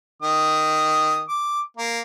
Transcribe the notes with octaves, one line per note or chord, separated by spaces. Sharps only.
D#3 D#6
D6
A#3